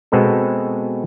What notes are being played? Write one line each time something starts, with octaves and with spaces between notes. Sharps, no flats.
B2 G#3 B3 C4 A4